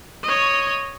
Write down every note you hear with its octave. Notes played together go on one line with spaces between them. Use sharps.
C#5 D#5